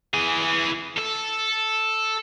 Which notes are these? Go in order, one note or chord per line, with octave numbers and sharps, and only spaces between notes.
E3 G#4
A4